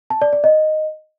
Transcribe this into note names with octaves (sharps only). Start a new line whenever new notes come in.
A5
D5
D5
D#5